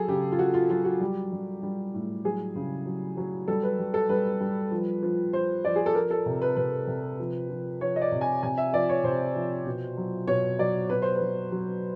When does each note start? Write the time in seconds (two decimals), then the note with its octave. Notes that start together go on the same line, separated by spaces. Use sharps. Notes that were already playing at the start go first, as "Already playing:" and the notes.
Already playing: F#3 G#4 A4
0.08 C#3 G4
0.32 F4
0.38 F#3 F#4
0.54 F4
0.70 F#3 F4
0.85 F#4
1.00 G3 G4
1.32 G3
1.63 G3
1.94 A2
2.24 F#3 G#4
2.56 C#3
2.86 F#3
3.17 F#3
3.48 G3 A4
3.63 B4
3.79 G3
3.94 A4
4.09 G3 B4
4.40 G3
4.71 F3
5.03 F3
5.33 F3 C5
5.65 F3 D5
5.76 G#4
5.86 A4
5.95 F3 A#4
6.11 A4
6.26 C3
6.42 B4
6.56 C3 B4
6.88 C3
7.19 F3
7.50 F3
7.81 F3 C#5
7.96 D#5
8.02 D5
8.12 C3
8.21 G#5
8.43 C3 G#5
8.58 E5
8.73 F3 D5
8.89 C#5
9.04 C3 C5
9.35 F3
9.67 B2
9.97 F#3
10.27 B2 C#5
10.59 F#3 D5
10.89 B2 B4
11.02 C5
11.16 F#3 B4
11.52 F#3